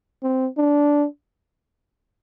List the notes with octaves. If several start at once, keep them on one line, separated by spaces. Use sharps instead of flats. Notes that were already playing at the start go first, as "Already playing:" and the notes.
C4
D4